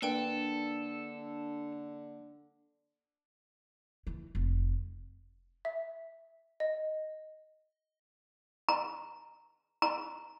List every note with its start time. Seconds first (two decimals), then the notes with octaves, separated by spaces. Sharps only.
0.02 D3 A#3 D4 A4 B4 G5 D7
4.07 E3
4.35 F1
5.65 E5
6.60 D#5
8.69 A#5
9.82 A#5